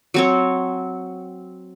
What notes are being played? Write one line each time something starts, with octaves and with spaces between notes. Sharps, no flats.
F#3 C4 C#5